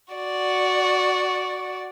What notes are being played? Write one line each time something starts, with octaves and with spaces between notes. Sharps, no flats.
F#4 D5